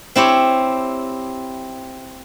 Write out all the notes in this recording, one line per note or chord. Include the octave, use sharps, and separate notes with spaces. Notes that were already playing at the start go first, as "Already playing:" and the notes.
C4 E4 G4 C#5